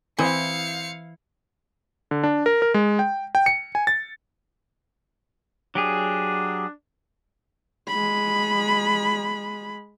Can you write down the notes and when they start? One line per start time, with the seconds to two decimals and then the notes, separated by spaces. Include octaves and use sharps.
0.18 E3 C4 E4 C5 F5 D#6 C#7
2.11 D3
2.24 D4
2.46 A#4
2.62 A#4
2.74 G#3
2.99 G5
3.35 G5
3.46 C#7
3.75 G#5
3.87 A6
5.75 F#3 D4 G4 G#4
7.88 G#3 B5